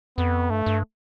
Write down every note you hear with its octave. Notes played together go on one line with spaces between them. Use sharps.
F2 B3
G2 A3
G2